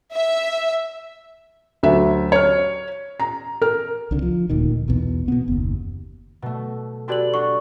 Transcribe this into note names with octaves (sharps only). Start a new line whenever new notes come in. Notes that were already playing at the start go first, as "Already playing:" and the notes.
E5
D2 F#3 E5
C#5 F6
A#5
A#4 F6
C2 D3
F3
D#1 D2 A#2 D#3
B1 E2 B2
B2 B3
F#1 D#2
B2 A3
F#4 G4 A4 B4 D5 F#7
D4 F#4 C#6